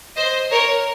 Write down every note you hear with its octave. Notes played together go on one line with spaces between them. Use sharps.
C5 D#5
A#4 C#5